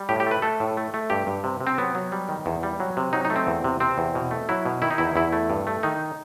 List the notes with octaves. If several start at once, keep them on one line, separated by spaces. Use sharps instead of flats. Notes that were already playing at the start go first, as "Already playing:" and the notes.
Already playing: G3
A2 G4
G4
A3 B4
A3 A4
A2
A3
A3
G2 G4
G2
C3
C3
C4
F#3 B3
F#3
G3
D#3
E2
G3
F#3
C3
F#3 D#4
D#4
A3
C4
E2
C3
C3 C4
E2
B2
A3
F#3 E4
B2
D#3 E4
D#4
E2 E4
E2 E4
A3
G2
A3
D#3 D#4